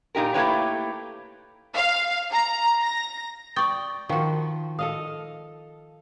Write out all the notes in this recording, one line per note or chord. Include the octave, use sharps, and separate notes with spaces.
A#2 D#4 G4 A#4
A3 A#3 E4 G4 B4 C#5
F5
A#5
A#6
D5 G5 C#6 D#6 A6
D#3 F3 F#4
A4 D#5 F5 D#6